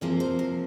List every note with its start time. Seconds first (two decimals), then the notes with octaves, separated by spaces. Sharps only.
0.01 C3 F3 A#3 G#4
0.20 C5
0.39 A#4